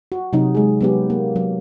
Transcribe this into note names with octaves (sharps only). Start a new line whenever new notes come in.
F#4
C3 F#3 D#4
G#3 G#4
F#3 B3 G4
A#3
F#3